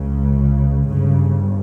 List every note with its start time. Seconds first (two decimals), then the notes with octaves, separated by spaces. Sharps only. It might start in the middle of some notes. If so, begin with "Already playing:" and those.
Already playing: C#2 C#3
0.87 G1 G2 C#3